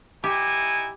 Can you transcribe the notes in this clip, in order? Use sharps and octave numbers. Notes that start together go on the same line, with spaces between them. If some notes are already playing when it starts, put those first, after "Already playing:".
D#4 E4 G4 G#5